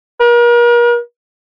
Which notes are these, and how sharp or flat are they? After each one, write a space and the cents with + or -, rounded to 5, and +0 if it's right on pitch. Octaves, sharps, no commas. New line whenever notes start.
A#4 +40